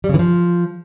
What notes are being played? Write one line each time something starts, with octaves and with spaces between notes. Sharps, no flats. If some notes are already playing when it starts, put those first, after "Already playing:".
G3
C#3
E3
F3